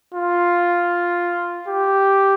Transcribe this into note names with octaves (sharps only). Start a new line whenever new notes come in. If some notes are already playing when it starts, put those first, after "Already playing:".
F4
G4